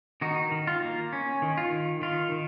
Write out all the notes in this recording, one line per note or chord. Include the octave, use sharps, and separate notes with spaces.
D#3 D#4 F#4
D#3
F4
A#3
C#4
D#3
F4
D#3
D#3 F4
D#3